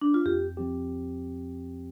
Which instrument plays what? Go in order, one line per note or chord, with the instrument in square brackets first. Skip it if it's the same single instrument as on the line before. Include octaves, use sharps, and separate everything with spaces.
[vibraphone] D4
F4
[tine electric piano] F2 [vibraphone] G4
[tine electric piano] F3 C4 G4